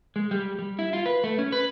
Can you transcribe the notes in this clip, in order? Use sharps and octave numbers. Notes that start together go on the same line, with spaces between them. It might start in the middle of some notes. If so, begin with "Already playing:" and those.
G#3
G3
G3
E4
F4
B4
A3
C#4
B4